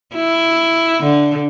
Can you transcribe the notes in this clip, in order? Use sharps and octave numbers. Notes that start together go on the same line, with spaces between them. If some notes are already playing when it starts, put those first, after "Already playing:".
E4
D3